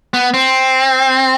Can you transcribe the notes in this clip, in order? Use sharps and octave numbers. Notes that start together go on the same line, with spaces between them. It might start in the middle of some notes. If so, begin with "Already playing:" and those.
B3
C4